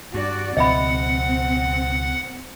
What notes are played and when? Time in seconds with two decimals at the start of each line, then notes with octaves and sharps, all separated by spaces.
0.14 G2 F#4 D5
0.57 C#2 B2 F3 C4 D#5 E5 F#5 B5